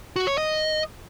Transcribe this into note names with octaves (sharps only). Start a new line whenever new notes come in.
F#4
C#5
D#5